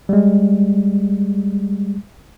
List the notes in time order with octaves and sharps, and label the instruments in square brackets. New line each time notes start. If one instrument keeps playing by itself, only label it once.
[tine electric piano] G3 G#3